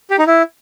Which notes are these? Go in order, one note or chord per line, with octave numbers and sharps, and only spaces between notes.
G4
D#4
E4